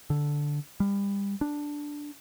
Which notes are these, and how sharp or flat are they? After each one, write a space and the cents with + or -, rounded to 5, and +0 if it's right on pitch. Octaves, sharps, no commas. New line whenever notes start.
D3 -5
G3 +30
D4 +0